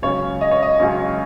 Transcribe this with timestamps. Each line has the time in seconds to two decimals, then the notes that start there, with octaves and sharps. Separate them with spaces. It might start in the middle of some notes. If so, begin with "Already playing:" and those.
0.02 C#2 C#3 F#3 C#4 C#5
0.41 D#5
0.51 C#5
0.62 D#5
0.79 C#2 C#3 F#3 C#4